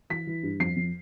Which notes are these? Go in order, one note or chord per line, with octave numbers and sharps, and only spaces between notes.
E3 B6
E3
G2
F2 C7
F2